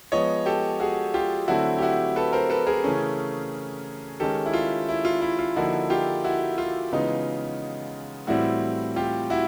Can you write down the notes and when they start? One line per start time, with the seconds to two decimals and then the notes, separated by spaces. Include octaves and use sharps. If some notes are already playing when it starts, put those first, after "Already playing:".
0.12 F3 G#3 B3 C#5 D#5
0.46 G4 A4
0.80 F#4 G#4
1.14 F4 G4
1.48 D3 F#3 A3 C4 E4 F#4
1.78 G4
1.82 E4 F#4
2.16 A4 B4
2.33 A#4 C5
2.50 A4 B4
2.67 G#4 A#4
2.84 C#3 E3 A3 C#4
4.20 D#3 G#3 C#4 G4 A4
4.46 E4
4.53 F4
4.89 E4
5.05 F4
5.21 E4
5.39 F4
5.56 D3 F3 A#3 D#4 E4 F#4
5.90 F4 G4
6.24 E4 F#4
6.58 F4
6.92 C#3 E3 G#3 B3 D#4
8.27 A2 E3 G3 C4 E4 F#4
8.96 F4 G4
9.30 E4 F#4